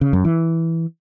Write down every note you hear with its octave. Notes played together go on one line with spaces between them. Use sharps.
C#3
F#2
E3